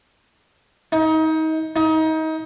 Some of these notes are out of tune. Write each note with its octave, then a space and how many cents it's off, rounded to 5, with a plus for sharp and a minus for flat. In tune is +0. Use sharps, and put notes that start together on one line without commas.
D#4 +30
D#4 +30